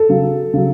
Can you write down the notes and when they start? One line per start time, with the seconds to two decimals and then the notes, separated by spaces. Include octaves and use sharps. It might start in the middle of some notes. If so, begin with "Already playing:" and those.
Already playing: A4
0.09 C#3 F#3
0.53 C#3 F#3